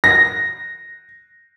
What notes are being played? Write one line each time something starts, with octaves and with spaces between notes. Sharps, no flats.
A#6